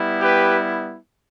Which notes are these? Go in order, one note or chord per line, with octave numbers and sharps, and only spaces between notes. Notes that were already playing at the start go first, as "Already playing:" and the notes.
Already playing: G3 B3 E4
G4 B4